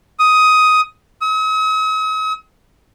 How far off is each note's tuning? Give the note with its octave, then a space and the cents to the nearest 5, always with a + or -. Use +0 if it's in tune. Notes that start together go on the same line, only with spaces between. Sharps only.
D#6 +10
D#6 +45